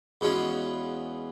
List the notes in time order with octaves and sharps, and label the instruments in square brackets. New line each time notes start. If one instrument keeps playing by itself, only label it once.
[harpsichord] E2 B2 G#3 C#4 F4